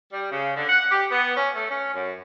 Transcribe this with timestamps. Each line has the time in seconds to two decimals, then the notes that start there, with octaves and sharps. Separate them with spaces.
0.12 G3
0.31 C#3
0.57 D3
0.69 F#5
0.91 G4
1.12 B3
1.36 C#4
1.55 A3
1.70 C#4
1.95 F#2